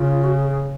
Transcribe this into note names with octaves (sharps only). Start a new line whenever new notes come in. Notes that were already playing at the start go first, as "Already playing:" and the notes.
Already playing: C#3 F4
F#4
G#4
G#4